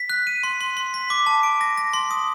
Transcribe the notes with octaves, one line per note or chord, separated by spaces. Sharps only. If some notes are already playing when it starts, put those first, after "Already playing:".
Already playing: B6
F#6
D#7
C6
C6
C6
B6
D6
A5
D7
A#6
A#6
C6
D#6